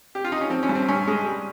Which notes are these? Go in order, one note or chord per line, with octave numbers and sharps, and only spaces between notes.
G4
F4
D#4
C#4
F3 C4
C#4
G2
C4
G2 C#4
G#3
G3